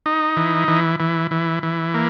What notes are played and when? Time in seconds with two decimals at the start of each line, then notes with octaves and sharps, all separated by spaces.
0.06 D#4
0.37 E3
0.68 E3
1.00 E3
1.31 E3
1.63 E3
1.94 A#3